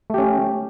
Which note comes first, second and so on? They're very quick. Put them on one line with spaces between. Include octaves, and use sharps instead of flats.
A3 G4 C#4